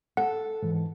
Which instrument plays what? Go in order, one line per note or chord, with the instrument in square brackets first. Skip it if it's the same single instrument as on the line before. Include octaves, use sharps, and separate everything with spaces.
[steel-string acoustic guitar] A4 [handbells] F#5
[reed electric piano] G#2 E3